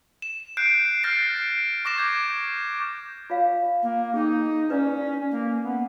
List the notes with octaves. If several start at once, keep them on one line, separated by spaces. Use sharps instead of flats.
E7
F#6 G6 C7 D7
F6 G6 A6 A#6 C7 D7
C#6 D6 A#6 E7
D6 G6 G#6
F4 C#5 F5
A#3
D#4 G#4 G5
C#4 E4 B4 D5
A#3
B3